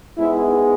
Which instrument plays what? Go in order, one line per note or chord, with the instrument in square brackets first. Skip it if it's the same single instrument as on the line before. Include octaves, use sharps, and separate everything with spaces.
[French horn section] G#2 G#3 B3 E4